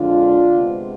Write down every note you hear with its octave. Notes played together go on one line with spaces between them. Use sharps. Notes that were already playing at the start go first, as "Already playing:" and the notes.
Already playing: F2 D3 G#3 D4 F4
C3 G#3 B3